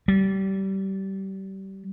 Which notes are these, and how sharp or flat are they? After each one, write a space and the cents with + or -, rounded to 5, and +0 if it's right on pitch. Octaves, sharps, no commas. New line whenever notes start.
G3 -25